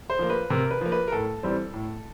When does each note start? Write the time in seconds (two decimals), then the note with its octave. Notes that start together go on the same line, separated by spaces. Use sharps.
0.10 C5
0.19 F3 A#3
0.30 B4
0.50 C3 A#4
0.71 B4
0.81 F3 A#3
0.92 B4
1.08 A#4
1.12 A2 A4
1.43 E3 G3 C4
1.74 A2